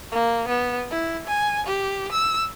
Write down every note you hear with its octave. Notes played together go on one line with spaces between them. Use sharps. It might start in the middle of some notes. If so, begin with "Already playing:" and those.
A#3
B3
E4
G#5
G4
E6